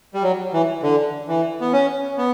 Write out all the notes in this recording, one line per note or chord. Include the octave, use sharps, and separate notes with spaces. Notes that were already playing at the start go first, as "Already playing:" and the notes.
G3
F#3
E3
D3
E3
B3
C#4
B3